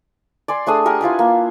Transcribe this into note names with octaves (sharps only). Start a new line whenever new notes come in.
D5 G#5 C6
A3 D4 G#4 D#6
G4 A#4 F#5 G#5
E4 F4 B4 G#5
A#3